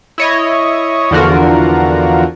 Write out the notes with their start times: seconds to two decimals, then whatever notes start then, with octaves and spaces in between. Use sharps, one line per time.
0.18 E4 C#5 D#5
1.11 E2 D3 F3 F4 F#4 A#4